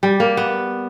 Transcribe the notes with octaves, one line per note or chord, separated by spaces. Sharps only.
G3
A#3
B3